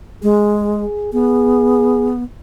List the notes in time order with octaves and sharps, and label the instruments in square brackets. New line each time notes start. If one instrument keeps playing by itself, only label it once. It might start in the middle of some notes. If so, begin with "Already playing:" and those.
[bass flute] G#3 [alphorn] G#4
[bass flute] B3 [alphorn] G#4